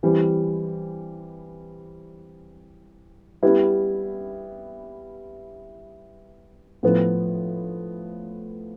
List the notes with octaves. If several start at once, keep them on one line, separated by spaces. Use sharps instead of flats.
E3 G3 C4
G3 B3 E4
A2 F3 B3